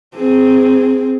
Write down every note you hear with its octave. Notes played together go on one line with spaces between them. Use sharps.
C4 G#4